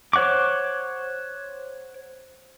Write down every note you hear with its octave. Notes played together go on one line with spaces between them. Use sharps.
C5 C#5 F#5 C#6 D6